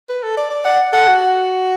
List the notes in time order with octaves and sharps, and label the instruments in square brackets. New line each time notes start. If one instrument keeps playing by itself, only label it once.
[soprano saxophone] B4
A4
D5
D5
[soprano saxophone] D5 [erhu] F#5
[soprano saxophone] A4 [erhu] F#5
[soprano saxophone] F#4